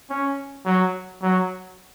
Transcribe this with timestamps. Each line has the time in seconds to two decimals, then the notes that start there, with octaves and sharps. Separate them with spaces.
0.10 C#4
0.66 F#3
1.22 F#3